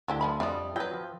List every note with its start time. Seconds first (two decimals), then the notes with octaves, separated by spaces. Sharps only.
0.08 D2 G#3 E4 G4
0.21 F3 D#5 F5 A5 B5 C6
0.40 F2 G3 D4 D5 E5 C#6 D#6
0.76 F#3 F4 B4 G5
0.94 F3